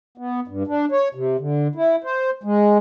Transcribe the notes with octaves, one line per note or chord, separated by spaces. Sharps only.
B3
G2
D4
C#5
C3
D3
E4
C5
G#3